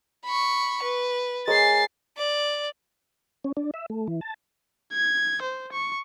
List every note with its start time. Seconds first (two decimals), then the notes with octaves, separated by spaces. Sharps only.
0.24 B5 C#6
0.83 B4
1.47 G#3 A#4 C#5 A6 C7
2.17 D5
3.44 C#4
3.57 D4
3.74 E5
3.90 A3
4.07 E3
4.21 A5
4.93 G#6
5.42 C5
5.73 C#6